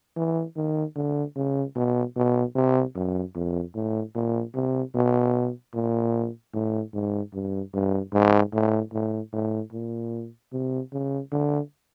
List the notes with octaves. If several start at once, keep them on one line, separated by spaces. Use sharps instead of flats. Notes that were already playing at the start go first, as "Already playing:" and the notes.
E3
D#3
D3
C#3
B2
B2
C3
F#2
F2
A2
A#2
C3
B2
A#2
A2
G#2
G2
G2
G#2
A2
A2
A2
A#2
C3
C#3
D3